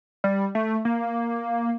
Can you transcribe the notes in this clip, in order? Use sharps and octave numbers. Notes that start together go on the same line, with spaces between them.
G3
A3
A#3